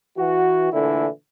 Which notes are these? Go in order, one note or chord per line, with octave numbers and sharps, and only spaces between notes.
E3 F#4
A#2 D3 E3 A3 E4